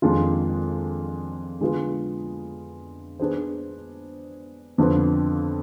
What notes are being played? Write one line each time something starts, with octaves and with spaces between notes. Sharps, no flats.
F2 D#3 G#3 D4 F4
D3 G#3 B3 F4
B3 D4 G#4 C5
F2 D3 F3 B3